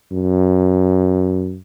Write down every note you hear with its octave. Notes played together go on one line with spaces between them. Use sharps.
F#2